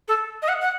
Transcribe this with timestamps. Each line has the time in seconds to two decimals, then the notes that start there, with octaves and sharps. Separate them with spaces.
0.08 A4
0.42 D#5
0.48 F#5
0.61 F#5